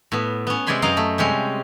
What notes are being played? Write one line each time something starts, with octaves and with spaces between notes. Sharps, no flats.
A2 B3
B3 C#4
C3 G#3 D5 G#5 B5 C6
F#2 D#5 F5 A#5
A3
C3 G3 G#3 C#4